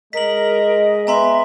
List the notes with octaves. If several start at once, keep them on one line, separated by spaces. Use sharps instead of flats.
G#3 A#4 D#5 B6 F#7
B3 E5 G#5 A#5 C6